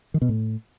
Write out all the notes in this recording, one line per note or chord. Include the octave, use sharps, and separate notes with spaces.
D#3
B2
A2